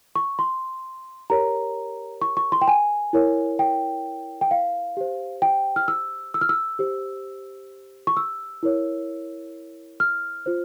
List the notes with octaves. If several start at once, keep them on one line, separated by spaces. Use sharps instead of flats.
C#6
C6
G4 A#4 C#5 A#5
C#6
C#6
C6
G5
G#5
E4 A#4 C#5
G5
G5
F5
G4 C5
G5
F6
E6
E6
F6
E6
G4 C5
C#6
E6
E4 A#4 C#5
F6
F4 C5